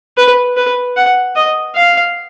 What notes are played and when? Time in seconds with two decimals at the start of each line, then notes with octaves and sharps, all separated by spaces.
0.17 B4
0.57 B4
0.97 F#5
1.36 D#5
1.75 F5